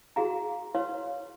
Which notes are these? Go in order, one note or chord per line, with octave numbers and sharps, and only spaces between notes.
F#4 G#4 F5 A#5
B4 C#5 F5 C6